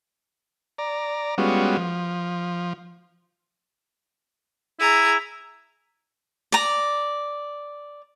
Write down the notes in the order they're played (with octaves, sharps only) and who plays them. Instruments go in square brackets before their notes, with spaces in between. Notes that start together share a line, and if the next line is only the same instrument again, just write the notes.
[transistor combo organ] D5 A#5
G3 G#3 B3 C#4 F4 F#4
F3
[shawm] E4 [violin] G#4 A#5
[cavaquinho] D5 A#5